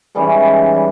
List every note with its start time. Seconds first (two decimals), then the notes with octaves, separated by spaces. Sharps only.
0.15 G#2 E3 G3 C#4
0.75 G3